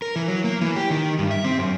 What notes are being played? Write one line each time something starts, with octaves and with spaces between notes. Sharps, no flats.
A#4
E3
F#3
A#3
E3
G4
D#3
G2
E5
C4
F#2